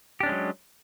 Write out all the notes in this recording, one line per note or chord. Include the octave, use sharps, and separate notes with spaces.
F#3 G#3 C#4 D4 G4